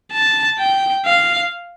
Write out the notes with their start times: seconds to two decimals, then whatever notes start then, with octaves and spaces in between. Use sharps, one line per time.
0.13 A5
0.59 G5
1.06 F5